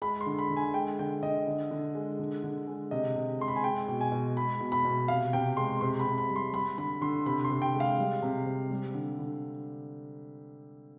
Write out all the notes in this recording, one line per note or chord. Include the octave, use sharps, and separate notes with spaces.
G#3 B5
C6
D3
B5
D3
G#5
G#3 G5
D3 G5
D3 D#5
D3
D3
G#3
D3
D3
G#3
C3 D#5
C3
G#3 C6
B5
G#5
G#3 G5
B2
G#5
B2
G#3 B5
B2
B5
B2
C3 F5
C3 G5
G#3 C6
C3 C6
B5
C3
B5
G3
C6
G3 B5
D3 B5
D3 C6
C3 B5
C6
C3
G5
G#3
F5
G3
C3
C3
G3
D3
D3